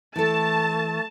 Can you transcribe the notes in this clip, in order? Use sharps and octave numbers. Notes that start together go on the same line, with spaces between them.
E3 A3 A4 A5